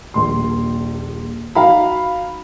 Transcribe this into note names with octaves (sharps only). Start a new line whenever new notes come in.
D#1 A#1 C6
D#4 F#4 F5 A#5 B5